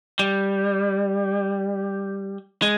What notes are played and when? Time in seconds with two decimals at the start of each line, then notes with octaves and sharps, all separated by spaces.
0.19 G3
2.62 G#3